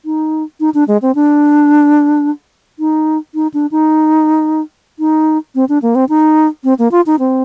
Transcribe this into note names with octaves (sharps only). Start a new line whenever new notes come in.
D#4
D#4
D4
G#3
C4
D4
D#4
D#4
D4
D#4
D#4
C4
D4
A#3
C4
D#4
C4
A#3
F4
D#4
C4